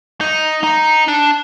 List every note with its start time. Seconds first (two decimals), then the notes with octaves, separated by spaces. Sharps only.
0.21 D#4
0.64 D#4
1.08 D4